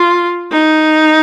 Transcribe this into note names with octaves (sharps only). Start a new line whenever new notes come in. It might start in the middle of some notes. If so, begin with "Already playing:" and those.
Already playing: F4
D#4